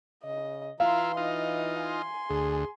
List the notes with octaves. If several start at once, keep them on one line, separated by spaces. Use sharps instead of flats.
C#3 D#5
E3 E4 F4 F5 A#5 C6
D#4 F4 D#5
G#5 C6
D2 G#4